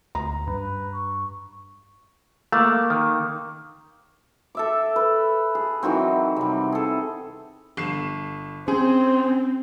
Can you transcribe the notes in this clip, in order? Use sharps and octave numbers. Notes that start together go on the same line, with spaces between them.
D2 A#5
G2 B4
C#6
A3 A#3
D#3
A4 E5 D6
B4
G#4
D#3 E3 F#3 C4
C3 G3
G#4 A4
G1 C7 E7
C4 C#4 G#4 C5